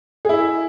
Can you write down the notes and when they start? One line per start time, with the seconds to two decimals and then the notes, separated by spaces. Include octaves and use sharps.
0.25 G#4
0.29 E4
0.34 E5